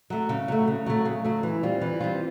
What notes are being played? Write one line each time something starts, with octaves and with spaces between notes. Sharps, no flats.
F#3 A3
C#3
F#3 A3
C#3
F#3 A3
C#3
F#3 A3
E3
G3 C4 F4
E3
G3 C4 F4